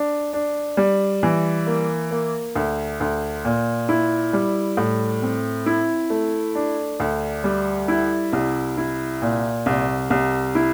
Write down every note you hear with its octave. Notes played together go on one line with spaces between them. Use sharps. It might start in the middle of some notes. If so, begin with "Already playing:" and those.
Already playing: D4
D4
G3
E3
A#3
A#3
D2
D2
A#2
E4
G3
A2
C4
E4
A3
D4
D2
G3
E4
C2
E4
A#2
C2
C2
E4